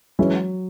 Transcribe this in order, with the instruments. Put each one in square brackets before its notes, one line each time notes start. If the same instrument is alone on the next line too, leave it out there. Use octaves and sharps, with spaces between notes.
[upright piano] E3 G#3 C#4 E4 [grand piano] F#3